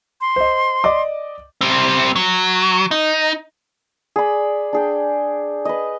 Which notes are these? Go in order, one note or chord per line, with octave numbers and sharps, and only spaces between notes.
C6
C5 D#5
D5 D#5 D6
G3 C4
F#3
D#4
G#4 D5 B5
D4 G#4 G5
B4 D#5